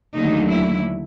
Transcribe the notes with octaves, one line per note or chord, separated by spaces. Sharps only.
D#2 D3 F#3 A3 D#4
E4